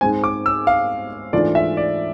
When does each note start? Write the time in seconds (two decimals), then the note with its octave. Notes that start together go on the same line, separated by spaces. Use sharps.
0.01 G#2 G#3 C4 G#5
0.24 D6
0.46 E6
0.67 F5
1.33 G#2 E3 A3 D4 F4 D5
1.55 E5
1.77 D5